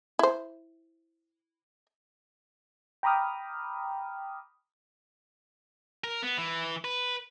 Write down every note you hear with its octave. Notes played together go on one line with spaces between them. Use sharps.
E4 C5
G5 A#5 B5 D6 D#6 F6
A#4
B3
E3
B4